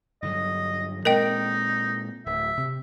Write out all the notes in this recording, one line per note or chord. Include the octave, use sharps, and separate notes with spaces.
G2 D3 F#3 D#5
A#2 G#3 C4 D#4 A#4 D#5 G5
D1 D2 E5
C3